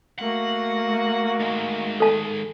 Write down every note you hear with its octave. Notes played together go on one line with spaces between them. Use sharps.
A3 A#3 F#4 F#5
D#3 G#3
A4 A5